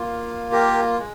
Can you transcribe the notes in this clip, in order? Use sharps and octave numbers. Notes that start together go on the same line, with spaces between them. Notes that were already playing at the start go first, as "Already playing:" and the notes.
Already playing: A#3 F4
G4 A#4
G#3